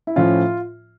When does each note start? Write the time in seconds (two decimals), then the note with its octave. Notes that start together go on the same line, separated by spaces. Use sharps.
0.07 E4
0.16 A2 F3 C#4 F4